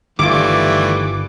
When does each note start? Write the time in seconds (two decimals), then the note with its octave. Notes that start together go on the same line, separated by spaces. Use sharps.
0.19 G1 D#3 E3 G3 A3 E4 F4 D6